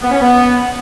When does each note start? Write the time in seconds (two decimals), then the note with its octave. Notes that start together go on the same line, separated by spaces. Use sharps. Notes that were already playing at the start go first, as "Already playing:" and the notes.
0.01 B3
0.10 C#4
0.20 B3